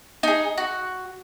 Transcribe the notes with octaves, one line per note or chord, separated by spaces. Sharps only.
D#4 G#4
F#4